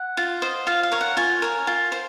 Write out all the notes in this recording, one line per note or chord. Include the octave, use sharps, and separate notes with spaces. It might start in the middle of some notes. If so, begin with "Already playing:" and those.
Already playing: F#5
F4
C5 D#5
F4 F5
F5
A#4 C#5
F#5
F4 G#5
A#4 C#5
F4
C5